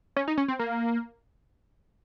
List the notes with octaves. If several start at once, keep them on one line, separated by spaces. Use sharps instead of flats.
C#4
D#4
C#4
C4
A#3